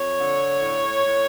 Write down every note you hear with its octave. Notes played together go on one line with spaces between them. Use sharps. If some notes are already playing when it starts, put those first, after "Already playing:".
Already playing: F2 C#5
D3
A2
A2